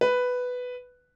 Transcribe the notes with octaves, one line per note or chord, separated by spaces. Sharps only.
B4